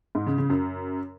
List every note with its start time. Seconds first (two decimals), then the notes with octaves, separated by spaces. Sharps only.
0.15 G#2
0.27 C#3
0.38 C#3
0.50 F#2